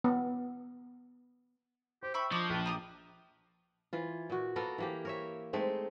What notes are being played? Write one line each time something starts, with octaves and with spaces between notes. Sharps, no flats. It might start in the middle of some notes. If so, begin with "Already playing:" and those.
B3
G4 C5
E5 G5 B5 C#6
F3 D4 D#5 C#6 D6
A#1 B4
G4 A#4 A#5 D#6
E3 F4
A#2 F#4
A#3 B3 A4 A#4
E3 A#3 G4
A#4 C#5 E5
G#3 A3 C4 D#4